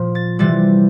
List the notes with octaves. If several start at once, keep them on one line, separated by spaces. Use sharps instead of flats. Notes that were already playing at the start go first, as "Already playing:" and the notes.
Already playing: A#2 F3
A6
C3 E3 G3 A6